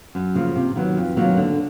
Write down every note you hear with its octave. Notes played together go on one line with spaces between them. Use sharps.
F#2
C#3 F3 A#3
C3
D#3 F#3 B3
F2
C3 D#3 F#3 A#3
D3